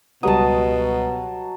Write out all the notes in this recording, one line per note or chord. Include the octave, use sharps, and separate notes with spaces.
C#2 B2 F#3 G3 A5 D#6